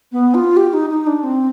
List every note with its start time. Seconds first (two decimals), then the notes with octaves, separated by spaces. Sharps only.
0.12 B3
0.34 F4
0.57 G4
0.73 D#4
0.90 D#4
1.07 D4
1.24 C4